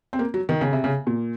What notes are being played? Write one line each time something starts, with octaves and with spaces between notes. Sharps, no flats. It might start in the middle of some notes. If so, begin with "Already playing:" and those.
C4
A#3
F#3
D#3
C#3
C3
C#3
A#2